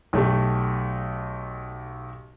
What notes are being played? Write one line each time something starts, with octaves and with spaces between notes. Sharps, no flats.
B1 A3 G4